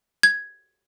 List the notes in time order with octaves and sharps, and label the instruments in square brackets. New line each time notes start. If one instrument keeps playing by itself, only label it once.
[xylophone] G#6